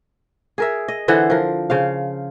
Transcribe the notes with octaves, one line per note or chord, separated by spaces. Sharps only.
G#4 A#4 E5
D#5
D3 E3 C5 F#5
F3 A#4
C#3 C5 F5